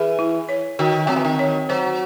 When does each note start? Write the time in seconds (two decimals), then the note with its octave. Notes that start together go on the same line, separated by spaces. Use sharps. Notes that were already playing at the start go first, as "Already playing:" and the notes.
Already playing: E3 G#4
0.19 E4
0.49 C#5
0.79 D#3 F#4
1.07 F#3 C4
1.16 E3
1.25 D#3
1.39 C#5
1.69 F#3 C5